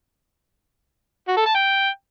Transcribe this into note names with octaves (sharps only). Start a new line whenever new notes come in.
F#4
A4
A5
G5